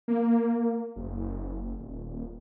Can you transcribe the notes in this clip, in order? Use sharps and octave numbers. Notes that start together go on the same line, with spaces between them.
A#3
F#1
D#1